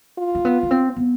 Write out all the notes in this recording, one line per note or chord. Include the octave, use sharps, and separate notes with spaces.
F4
A#3
B3
B3
C4
B3